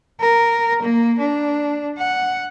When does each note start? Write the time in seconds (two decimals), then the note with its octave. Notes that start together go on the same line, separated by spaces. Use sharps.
0.20 A#4
0.82 A#3
1.19 D4
1.98 F#5